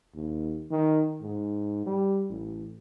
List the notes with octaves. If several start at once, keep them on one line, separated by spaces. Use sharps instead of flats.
D#2
D#3
G#2
G3
A1